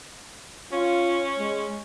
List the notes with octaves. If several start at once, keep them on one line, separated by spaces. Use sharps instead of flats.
C#4 F4
G#3